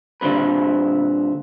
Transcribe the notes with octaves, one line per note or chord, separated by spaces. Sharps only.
A#2 D3 G3 C4 B4